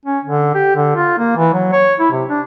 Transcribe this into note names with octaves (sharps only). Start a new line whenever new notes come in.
C#4
D3
G4
D3
F4
A#3
E3
F#3
C#5
E4
C3
D4